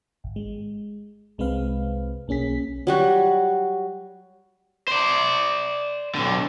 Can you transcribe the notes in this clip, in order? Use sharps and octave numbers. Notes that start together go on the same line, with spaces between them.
G#1
G#3
C2 G#3 C4 B4 F5
B1 A#3 C#4 G#4 B6
F#3 G3 F#4
C5 D5
B1 D3